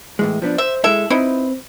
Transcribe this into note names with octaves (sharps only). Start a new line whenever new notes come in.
A2 E3 G#3
F3 B3 D4
C5 E5
G#3 E4 A4 E5
C4 D#4 E4 B4